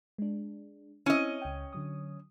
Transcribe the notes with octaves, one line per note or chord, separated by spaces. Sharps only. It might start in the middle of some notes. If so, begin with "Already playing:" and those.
G#3 D4
C4 C#4 E4 D#5
C#2 G5
D3 F#3 D#6